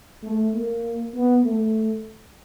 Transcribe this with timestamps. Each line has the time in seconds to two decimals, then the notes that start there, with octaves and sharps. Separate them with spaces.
0.24 A3
0.54 A#3
1.14 B3
1.44 A3